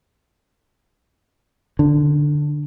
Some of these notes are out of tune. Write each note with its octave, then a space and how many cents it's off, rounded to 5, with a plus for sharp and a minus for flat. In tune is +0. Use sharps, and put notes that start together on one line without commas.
D3 +5